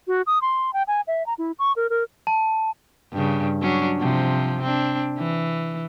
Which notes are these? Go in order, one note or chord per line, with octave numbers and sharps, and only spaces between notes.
F#4
D#6
C6
G5
G#5
E5
A#5
E4
C#6
A#4
A#4
A5
G2 C#3
F#3 C#4 D4
C3 F3
C4 D4
E3